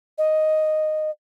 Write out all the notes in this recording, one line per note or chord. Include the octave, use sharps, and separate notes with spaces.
D#5